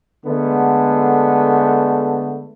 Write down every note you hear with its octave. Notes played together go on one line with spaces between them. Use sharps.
D3 G#3 A3 B3